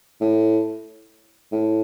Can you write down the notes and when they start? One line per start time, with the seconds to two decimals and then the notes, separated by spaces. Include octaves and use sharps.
0.21 A2
1.52 A2